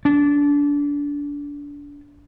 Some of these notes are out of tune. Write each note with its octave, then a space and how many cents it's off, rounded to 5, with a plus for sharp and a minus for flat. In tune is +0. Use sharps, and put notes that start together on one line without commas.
D4 -25